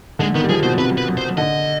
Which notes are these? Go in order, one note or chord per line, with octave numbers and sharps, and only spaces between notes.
D3 G#3
D#3 B3
G3
F3 G#4
B2 C5
C3 B4
B4
C5
D3 D#5